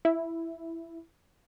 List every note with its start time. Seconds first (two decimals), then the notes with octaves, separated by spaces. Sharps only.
0.05 E4